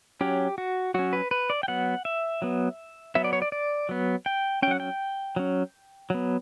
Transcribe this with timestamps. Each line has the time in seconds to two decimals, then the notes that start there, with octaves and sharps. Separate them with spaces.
0.21 F#3 C#4 G4
0.58 F#4
0.94 F#3 C#4 F#4
1.13 B4
1.31 B4
1.50 D5
1.63 G5
1.68 F#3 B3 F#5
2.05 E5
2.42 F#3 B3
3.15 F#3 B3 E5
3.24 D5
3.33 C#5
3.42 D5
3.52 D5
3.89 F#3 B3
4.26 G5
4.62 C#4 G5
4.67 F#3 F#5
4.80 G5
5.36 F#3 C#4
6.10 F#3 B3